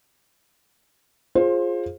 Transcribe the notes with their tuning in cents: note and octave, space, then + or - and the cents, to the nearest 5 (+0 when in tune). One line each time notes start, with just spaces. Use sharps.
F4 +5 G#4 +0 C5 +25